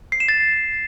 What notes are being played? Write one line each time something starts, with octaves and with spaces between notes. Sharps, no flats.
C7
E7
A6